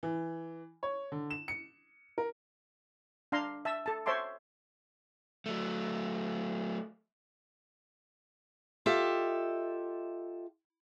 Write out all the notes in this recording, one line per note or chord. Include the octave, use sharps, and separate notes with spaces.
E3
C#5
D3
E7
C#7
A#4
D4 F5 A#5 C6
E5 A5 E6
A4 A5
C5 C#5 E5 A5 C6 D6
F#3 A3
F4 G4 A4 D#5 E5